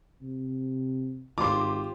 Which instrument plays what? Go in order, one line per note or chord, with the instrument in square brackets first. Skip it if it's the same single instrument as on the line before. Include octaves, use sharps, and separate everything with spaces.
[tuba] C3
[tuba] G#1 [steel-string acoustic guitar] F4 G4 C5 [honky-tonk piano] C6 D6